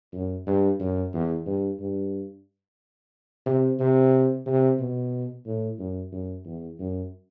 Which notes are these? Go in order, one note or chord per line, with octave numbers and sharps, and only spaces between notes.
F#2
G2
F#2
E2
G2
G2
C3
C3
C3
B2
A2
F#2
F#2
E2
F#2